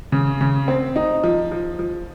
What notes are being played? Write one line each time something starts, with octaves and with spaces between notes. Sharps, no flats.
C#3
C#3
C4
D#4
F3
F3
F3